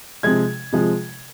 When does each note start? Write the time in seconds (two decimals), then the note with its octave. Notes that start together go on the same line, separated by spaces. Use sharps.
0.23 C3 F3 G#3 G#6
0.72 C3 F3 G#3